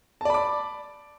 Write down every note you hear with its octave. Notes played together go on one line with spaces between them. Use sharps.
D5 A5 B5 D6